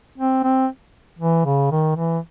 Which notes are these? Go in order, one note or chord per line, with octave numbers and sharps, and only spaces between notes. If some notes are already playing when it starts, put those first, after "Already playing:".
C4
C4
E3
C#3
D#3
E3